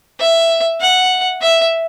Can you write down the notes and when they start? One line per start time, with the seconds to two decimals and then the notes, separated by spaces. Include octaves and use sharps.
0.20 E5
0.81 F#5
1.42 E5